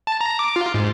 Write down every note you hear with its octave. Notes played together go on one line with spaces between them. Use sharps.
A5
A#5
D6
F4
G#2